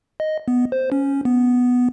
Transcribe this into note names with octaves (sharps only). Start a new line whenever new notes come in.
D#5
B3
C5
C#4
B3